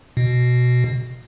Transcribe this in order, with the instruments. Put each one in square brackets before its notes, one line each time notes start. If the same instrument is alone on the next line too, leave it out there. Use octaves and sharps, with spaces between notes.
[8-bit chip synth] B2